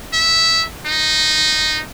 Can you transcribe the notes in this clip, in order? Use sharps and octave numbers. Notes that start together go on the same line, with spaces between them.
E5
D#4